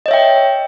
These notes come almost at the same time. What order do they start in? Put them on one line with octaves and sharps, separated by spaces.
D#5 C#5 E5 G5